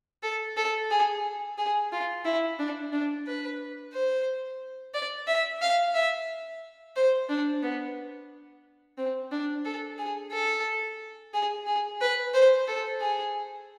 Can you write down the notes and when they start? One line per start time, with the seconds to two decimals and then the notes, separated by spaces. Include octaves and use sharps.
0.23 A4
0.57 A4
0.90 G#4
1.58 G#4
1.92 F4
2.25 E4
2.58 D4
2.92 D4
3.27 B4
3.93 C5
4.94 D5
5.27 E5
5.61 F5
5.94 E5
6.96 C5
7.29 D4
7.62 B3
8.98 C4
9.31 D4
9.65 A4
9.98 G#4
10.32 A4
11.34 G#4
11.67 G#4
12.01 B4
12.34 C5
12.67 A4
13.01 G#4